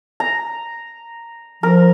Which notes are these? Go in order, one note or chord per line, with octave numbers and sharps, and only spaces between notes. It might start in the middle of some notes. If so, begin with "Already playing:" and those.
A#5
F3 A#4